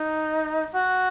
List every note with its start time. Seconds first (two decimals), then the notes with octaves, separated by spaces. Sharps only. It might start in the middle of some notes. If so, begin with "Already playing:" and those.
Already playing: D#4
0.73 F#4